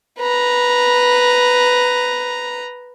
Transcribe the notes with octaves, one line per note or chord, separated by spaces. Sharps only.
B4 A#5